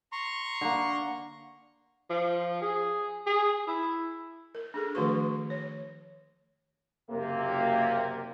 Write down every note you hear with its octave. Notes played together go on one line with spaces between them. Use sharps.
A#5 C6 C#6
D3 A#3
F3
G#4
G#4
E4
A#4
D4 G#4 A4
D#3 F3 A3 F#4 B4 C#6
C#5
F#1 C3 A#3